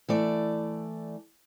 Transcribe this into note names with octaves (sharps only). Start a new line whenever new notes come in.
E3 A3 D5